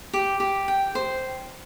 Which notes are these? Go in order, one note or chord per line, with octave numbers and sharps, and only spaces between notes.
G4
G4
G5
C5